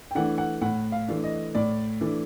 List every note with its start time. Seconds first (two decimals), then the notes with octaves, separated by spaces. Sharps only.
0.11 G5
0.15 E3 A3 D4 F#5
0.38 F#5
0.61 A2 F#5
0.92 F5
1.08 E3 A3 D4
1.24 D#5
1.55 A2 D5
2.01 E3 A3 D4